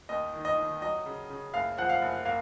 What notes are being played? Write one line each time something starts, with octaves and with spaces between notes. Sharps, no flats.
D#2 D#5
D#3
D#5
D#3
F#3 D#5
C#3
C#3
F#1 F5
F3 F#5
F5
F#1
A#3 F5